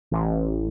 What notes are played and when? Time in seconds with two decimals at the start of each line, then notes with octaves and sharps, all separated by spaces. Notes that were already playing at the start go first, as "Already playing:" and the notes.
0.11 A1